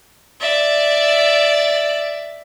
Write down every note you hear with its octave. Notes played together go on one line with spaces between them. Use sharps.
D5 E5